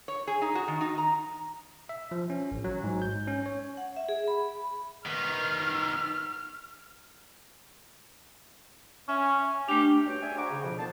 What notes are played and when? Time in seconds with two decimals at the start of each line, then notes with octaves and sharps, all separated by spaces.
0.08 C#5
0.27 G#4
0.42 D#4
0.55 F#4
0.68 D#3
0.81 D#4
0.98 A#5
1.89 E5
2.11 F3
2.30 C#4
2.51 A1
2.64 F#3
2.84 G#2
3.02 G6
3.27 C#4
3.46 C#5
3.77 F#5
3.97 E5
4.09 G#4
4.28 B5
5.06 D#3 B3 F6
9.09 C#4 E5
9.69 A3 D4 G4
10.06 G2 D4 F#4 C#5 G5
10.22 G#4 D5 E5 G5 G#5
10.37 C5 F#5 G5 A#5 C#6 D6
10.50 C#3
10.63 F2 B2 F3
10.78 A#2 D3 B3 D#4 C5 A5